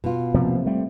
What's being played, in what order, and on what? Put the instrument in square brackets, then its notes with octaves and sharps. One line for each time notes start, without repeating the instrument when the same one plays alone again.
[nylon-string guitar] B2 F4
[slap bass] C3 F3 A#3
G3 A3 C4